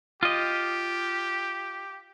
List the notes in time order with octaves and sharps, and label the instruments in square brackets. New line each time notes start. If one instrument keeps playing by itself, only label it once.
[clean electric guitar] F4 D#5 [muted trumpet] G4